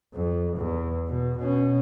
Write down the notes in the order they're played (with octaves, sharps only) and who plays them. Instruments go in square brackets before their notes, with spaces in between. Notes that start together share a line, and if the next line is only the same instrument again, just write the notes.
[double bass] F2
E2
B2
B2 C#4